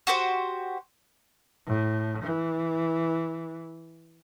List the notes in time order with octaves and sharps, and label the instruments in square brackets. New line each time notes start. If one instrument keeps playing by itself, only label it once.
[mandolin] F#4 G4 C5
[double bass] A2
E3